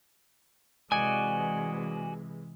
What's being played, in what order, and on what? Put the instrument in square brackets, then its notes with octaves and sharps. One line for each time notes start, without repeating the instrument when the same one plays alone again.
[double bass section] C3 E3 G#3 [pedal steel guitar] F#4 D5 D#5 [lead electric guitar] G#5